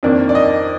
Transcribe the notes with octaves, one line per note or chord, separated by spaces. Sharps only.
F2 D#3 A#3 D4 D5
D5
D#5